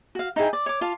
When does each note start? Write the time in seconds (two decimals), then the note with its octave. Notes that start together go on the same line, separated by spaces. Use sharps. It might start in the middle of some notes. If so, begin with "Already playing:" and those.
0.15 F#4 F5
0.36 D#4 E4 G#4 G5
0.53 D5
0.66 C#5 D6
0.81 F4 F5 A5